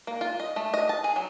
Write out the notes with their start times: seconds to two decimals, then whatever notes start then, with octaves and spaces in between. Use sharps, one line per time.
0.07 A#3
0.21 F4
0.40 D#5
0.56 A3
0.74 D#5
0.89 A5
1.04 G#4
1.16 F#3